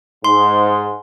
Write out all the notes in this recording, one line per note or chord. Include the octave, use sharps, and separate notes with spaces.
G#2 C6